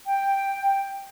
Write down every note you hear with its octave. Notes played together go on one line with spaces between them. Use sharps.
G5